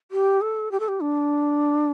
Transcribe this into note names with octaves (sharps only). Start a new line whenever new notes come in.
G4
A4
G4
A4
G4
D4